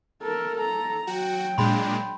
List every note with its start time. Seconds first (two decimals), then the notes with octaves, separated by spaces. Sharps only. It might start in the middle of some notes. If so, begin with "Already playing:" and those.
0.22 A4 A#4
0.58 A4 A#5
1.07 F#3 F#4 G5
1.58 A#2 G#3 D4 B5 C6